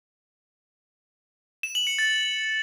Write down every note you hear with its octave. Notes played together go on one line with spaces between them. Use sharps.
E7
F#7
C#7
A6